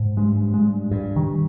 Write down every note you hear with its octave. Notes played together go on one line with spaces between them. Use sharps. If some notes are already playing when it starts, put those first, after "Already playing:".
Already playing: G#2
G2 G#3
G2 G#3
G2
D#3